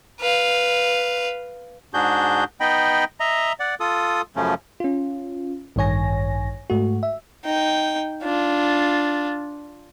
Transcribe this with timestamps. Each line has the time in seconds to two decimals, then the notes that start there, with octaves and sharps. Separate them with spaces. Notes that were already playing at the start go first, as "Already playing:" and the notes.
0.21 B4 F5
1.94 G#2 D4 F#4 G#4 G6
2.60 B3 D#4 D#5 G5 B5
3.20 D#5 E5 A#5
3.60 D5 F#5
3.80 F4 A4 D#6
4.36 F#2 C#3 F3 A3 C#4
4.80 C#4 F4
5.76 A1 G2 D#3 C#5 G#5 A#6
6.70 G#2 A3 F#4
7.03 E5
7.45 D#4 G5
8.24 D4 F4